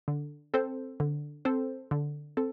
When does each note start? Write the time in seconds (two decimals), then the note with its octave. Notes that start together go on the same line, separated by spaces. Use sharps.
0.08 D3
0.54 C4 A4 C5
1.00 D3
1.45 C4 A4 C5
1.91 D3
2.37 C4 A4